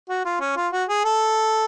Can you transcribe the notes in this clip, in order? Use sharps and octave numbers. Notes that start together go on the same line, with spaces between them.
F#4
F4
C#4
F4
F#4
G#4
A4